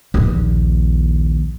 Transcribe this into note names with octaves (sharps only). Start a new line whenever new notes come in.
A#1 D#2